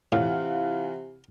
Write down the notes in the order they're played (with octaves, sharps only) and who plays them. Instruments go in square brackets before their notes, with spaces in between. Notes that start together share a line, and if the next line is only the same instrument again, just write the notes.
[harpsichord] A2 [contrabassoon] C3 [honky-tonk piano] E3 F4 F#5 [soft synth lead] F5